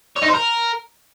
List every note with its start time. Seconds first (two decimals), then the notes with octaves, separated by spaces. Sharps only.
0.16 C#5
0.22 D#4
0.28 C5
0.34 A#4